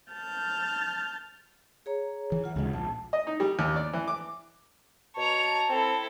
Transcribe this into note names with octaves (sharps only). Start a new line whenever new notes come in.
A5 F6 G6 A6
G#4 C#5 A#5
E3
F4 F#5
D2 C#3 G#3
A#1 A5
D#5
D#4
G3
D#2
D5
E3
D6
B2 C#5 A5 A#5
C4 E4 A4